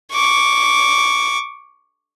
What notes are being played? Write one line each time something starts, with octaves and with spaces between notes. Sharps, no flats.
C#6 D6